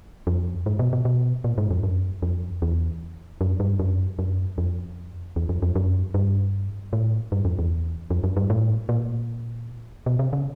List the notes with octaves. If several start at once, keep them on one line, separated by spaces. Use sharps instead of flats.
F2
G#2
B2
B2
B2
A#2
G#2
F2
F#2
F2
E2
F#2
G2
F#2
F#2
F2
E2
F2
F2
F#2
G2
A2
G2
F2
E2
F2
F#2
G2
A2
A#2
B2
C3
C#3